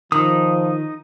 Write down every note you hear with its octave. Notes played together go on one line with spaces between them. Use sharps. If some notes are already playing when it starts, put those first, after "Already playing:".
D#3 F3 D#4 D#6